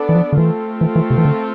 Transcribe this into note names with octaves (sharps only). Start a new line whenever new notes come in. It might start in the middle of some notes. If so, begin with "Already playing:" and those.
Already playing: B3 D4 A4 D5
E3
F3
D3
E3 A3 C4 F4 A4
E3
E3
C3
E3
D3